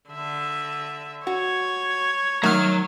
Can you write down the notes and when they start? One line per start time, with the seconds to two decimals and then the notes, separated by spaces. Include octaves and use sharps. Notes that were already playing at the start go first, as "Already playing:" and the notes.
0.10 D3 E5
1.27 F#4 C#5
2.43 D#3 F#3 A3 A#5 F6